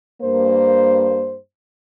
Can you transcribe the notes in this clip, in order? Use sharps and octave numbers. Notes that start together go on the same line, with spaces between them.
G2 A#3 C5